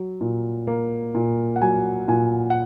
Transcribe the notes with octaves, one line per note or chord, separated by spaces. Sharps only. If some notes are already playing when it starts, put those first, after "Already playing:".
Already playing: F#3
A#2
A#3
A#2
F#5
F#3 G#5
A#2 G#5
F#5